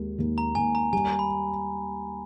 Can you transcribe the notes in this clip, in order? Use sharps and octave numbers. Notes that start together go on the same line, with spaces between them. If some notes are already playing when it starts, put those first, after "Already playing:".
Already playing: D#2 G#3
D#2
A#5
D#2 G#5
A#5
G3 G#5
B5